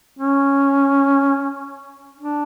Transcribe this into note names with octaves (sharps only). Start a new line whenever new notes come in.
C#4
D4